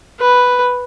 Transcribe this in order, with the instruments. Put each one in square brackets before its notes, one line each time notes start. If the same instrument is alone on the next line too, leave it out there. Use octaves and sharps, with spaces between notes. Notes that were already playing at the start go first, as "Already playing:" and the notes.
[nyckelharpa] B4